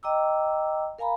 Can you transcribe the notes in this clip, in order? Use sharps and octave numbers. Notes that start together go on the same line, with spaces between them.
D#5 G5 A#5 D6 E6
A#4 F5 G#5 A#5 B5